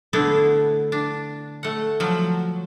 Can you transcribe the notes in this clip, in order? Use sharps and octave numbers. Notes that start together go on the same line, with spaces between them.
D3 A3 B3 D4 E4
D4
A3 F#5
F3 F#3